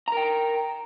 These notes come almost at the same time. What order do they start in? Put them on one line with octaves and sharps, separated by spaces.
A#5 A#4 G5